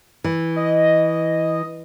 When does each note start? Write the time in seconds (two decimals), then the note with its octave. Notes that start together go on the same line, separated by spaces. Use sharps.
0.24 E3
0.56 D#5